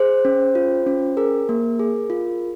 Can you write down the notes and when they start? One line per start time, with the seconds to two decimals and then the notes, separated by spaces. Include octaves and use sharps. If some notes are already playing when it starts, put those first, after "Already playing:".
Already playing: G#4 C5
0.25 C#4
0.55 F4
0.87 C#4
1.17 G#4 A#4
1.49 A#3
1.79 G#4
2.10 F4